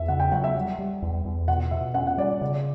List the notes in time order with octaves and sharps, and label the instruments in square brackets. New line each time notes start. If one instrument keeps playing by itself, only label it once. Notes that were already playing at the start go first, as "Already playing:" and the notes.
Already playing: [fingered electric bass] E2 [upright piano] E5
[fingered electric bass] C#3 [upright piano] F#5
[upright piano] G5
[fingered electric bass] F#3 [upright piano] F#5
[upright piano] E5
[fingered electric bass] G3
G3
E2
E2
[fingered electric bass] B2 [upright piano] F#5
[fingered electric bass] B2 [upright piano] E5
[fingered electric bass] C#4 [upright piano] F#5
[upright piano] F#5
[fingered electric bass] G3 [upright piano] D5
[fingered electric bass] C#3 [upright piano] D5